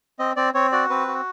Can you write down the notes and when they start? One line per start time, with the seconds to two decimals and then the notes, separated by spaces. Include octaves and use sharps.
0.19 C4 D#5
0.36 C4 D5
0.54 C4 C#5
0.72 F#4 D5
0.90 C4 B4
1.08 F#4